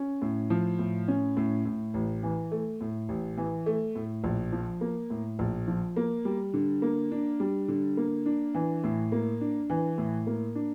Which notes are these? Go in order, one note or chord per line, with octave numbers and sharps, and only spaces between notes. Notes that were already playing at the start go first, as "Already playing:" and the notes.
Already playing: C#4
A2
F3
A2
C#4
A2
A2
A1
E3
A3
A2
A1
E3
A3
A2
A#1
F3
A#3
A2
A#1
F3
A#3
G3
D3
A#3
D4
G3
D3
A#3
D4
E3
A2
A#3
D4
E3
A2
A#3
D4